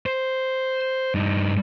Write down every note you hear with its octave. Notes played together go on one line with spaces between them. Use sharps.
C5
G2 D#4